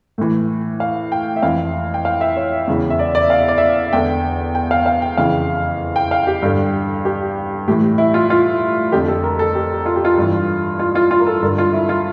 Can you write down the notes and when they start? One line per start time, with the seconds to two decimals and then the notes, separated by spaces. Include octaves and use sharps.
0.18 A2 E3
0.80 F5
1.12 G5
1.36 E5
1.42 F2 E3 F5
1.94 G5
2.05 F5
2.21 E5
2.37 C#5
2.67 E2 C#3 E3
2.90 E5
2.99 D5
3.15 D5
3.30 F5
3.40 E5
3.48 D5
3.58 E5
3.93 E2 D3 G5
4.55 G5
4.71 F5
4.86 F5
5.02 G5
5.17 F2 C#3 E3 F5
5.96 G5
6.11 F5
6.27 G4
6.42 G2 D3
7.05 G4
7.68 A2 E3 G4
7.98 E4
8.14 F4
8.30 F4
8.92 F2 D3 G4
9.08 A4
9.24 A#4
9.39 A4
9.55 G4
9.86 F4
9.96 G4
10.05 F4
10.18 G2 E3
10.79 F4
10.95 F4
11.11 F4
11.20 A#4
11.27 A4
11.42 G2 D3 A#4
11.58 F4
11.73 E4
11.89 F4